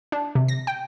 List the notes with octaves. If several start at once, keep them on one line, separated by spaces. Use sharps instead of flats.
D4
C3
A#6
G5